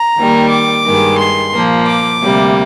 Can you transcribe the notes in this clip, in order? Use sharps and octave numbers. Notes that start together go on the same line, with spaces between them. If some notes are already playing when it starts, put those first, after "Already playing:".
Already playing: A#5
D#2 D#3 G3
D6
G2 D#3 G#3
C6
A#2 F3 A#3
D6
D2 C3 G3 A#3